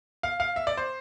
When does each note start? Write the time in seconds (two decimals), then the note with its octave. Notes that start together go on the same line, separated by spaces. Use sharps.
0.23 F5
0.40 F5
0.56 E5
0.67 D5
0.77 C5